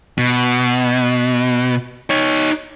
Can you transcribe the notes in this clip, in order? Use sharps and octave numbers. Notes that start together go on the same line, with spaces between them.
B2
D#4 C#5